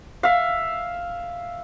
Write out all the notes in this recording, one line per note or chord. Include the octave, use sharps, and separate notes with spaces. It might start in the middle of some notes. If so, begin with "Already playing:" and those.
E5 F5